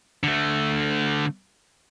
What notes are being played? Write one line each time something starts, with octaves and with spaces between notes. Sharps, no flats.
D3 A3